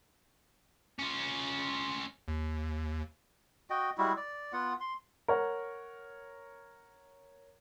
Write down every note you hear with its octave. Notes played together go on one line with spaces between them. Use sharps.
C#4 F4
D#2
F#4 D#5 G5
G3 G#3 E4 F#4
D5
B3 F4 F#5
C6
A#4 C#5 F#5